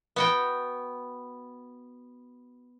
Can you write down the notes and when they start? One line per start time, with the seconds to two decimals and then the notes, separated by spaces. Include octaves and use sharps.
0.16 B3 F#4 G5